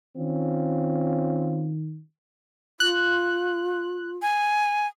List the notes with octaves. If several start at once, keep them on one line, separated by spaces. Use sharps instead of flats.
D#3 C4 C#4 F4
F4 F#6
G#5